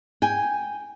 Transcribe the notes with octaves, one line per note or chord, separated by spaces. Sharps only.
G5 G#5